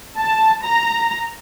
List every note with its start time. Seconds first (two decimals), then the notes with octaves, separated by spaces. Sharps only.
0.17 A5
0.64 A#5